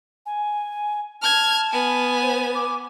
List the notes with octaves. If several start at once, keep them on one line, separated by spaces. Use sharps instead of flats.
G#5
A5 F6 G#6
B3 G#5
C5
D6